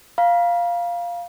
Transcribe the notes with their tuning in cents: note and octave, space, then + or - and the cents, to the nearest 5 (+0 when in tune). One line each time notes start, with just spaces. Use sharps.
F5 +0 A#5 +40